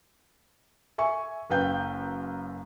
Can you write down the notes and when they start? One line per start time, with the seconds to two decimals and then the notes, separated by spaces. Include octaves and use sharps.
0.98 E5 G#5 C#6
1.50 F#1 F#2 B4 F5 G5 G6